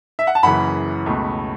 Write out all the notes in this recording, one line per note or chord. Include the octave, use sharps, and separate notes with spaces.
E5
F#5
A5
F#1 F#2 C#3 E3 F#5 B5
C#2 B2 A3